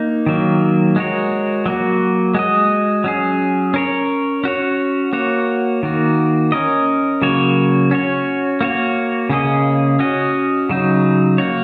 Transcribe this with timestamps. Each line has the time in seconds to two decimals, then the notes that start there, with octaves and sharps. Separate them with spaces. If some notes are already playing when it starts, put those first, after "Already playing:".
Already playing: A#3 D#4
0.26 D#3 F#3 A#3
0.96 G#3 F#4 A#4 C#5
1.66 F#3 A#3 F#4
2.35 G#3 F#4 D#5
3.04 F#3 C#4 G#4
3.74 C#4 A#4 C#5
4.44 C#4 F#4 C#5
5.13 A#3 F#4 C#5
5.83 D#3 A#3 F#4
6.52 C#4 A#4 D#5
7.22 C#3 F#3 A#3 F#4 C#5
7.91 C#4 F#4 C#5
8.61 A#3 F#4 C#5
9.29 C#3 A#3 C#4 G#4 D#5
9.99 C#4 F#4 D#5
10.69 C#3 F#3 D#4
11.38 A#3 F#4 C#5